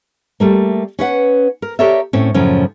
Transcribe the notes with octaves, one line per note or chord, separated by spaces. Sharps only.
G3 A3 A#3
C#4 B4 F#5
A#4
G4 A4 A#4 C#5 D5 E5
A2 C4 C#4
F#2 A2 C#3 F3 C#4